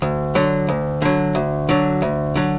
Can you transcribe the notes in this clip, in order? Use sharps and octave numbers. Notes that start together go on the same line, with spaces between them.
D2
D3 F#3
D2
D3 F#3
D2
D3 F#3
D2
D3 F#3